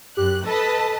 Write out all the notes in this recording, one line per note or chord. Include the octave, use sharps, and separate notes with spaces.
F#2 G4 F#6
A4 B4 D#5 A5